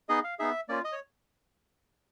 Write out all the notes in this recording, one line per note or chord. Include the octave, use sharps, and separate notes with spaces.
B3 D#4 G#4 D#5
F5
B3 D#4 G#4 E5
A#3 C#4 F4 D5
D#5
C#5